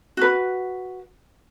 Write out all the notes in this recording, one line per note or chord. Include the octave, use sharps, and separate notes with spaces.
F#4 B4